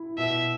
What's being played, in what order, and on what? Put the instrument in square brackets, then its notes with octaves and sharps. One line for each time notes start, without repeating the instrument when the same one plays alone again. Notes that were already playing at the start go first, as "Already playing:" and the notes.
Already playing: [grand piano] E4
[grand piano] B2 [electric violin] E5